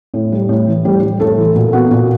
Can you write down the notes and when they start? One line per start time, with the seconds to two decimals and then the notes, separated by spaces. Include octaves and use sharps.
0.14 A2
0.32 G3
0.49 A2
0.68 E3
0.85 A2 G3 G4
1.03 G3
1.20 A2 A3 A4
1.37 E3
1.55 A#2 F#4
1.73 B3 F#4
1.91 A#2 F#4